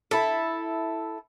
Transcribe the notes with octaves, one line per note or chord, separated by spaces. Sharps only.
E4 A4